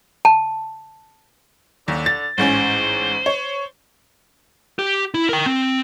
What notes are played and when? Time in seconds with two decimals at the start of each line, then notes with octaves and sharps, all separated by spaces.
0.25 A5
1.88 D#2 D3
2.06 A6
2.38 A1 G#2 C#4 C5
3.26 C#5
4.79 G4
5.14 E4
5.29 A#4 G5
5.46 C4